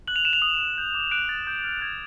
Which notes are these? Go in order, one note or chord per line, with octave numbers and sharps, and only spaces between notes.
F#6 F#7
F7
F#6 E7
F7
D#6 F#7
D#6
G6
D6
F#6 D7
F#6 A6
D6 G6
F6
F#6 G#6